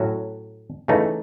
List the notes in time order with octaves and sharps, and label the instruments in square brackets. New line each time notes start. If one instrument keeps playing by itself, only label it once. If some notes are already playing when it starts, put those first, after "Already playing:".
Already playing: [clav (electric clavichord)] A2 F#3 C#4 F#4
C#3 E3 A3 D#4